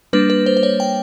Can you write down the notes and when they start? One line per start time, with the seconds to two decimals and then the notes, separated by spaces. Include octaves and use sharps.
0.13 G3 A#3 D4 B4
0.30 B4
0.46 C5
0.57 C5
0.63 C#5
0.80 G5